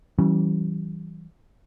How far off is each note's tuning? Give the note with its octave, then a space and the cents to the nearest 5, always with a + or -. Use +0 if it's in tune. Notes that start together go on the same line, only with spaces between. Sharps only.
E3 -15 G3 -40 C#4 +0